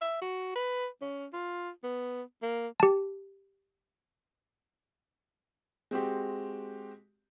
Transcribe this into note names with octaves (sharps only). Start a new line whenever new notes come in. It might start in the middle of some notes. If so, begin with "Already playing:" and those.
E5
F#4
B4
C#4
F4
B3
A#3
G4 A5
G#3 C4 F#4 G4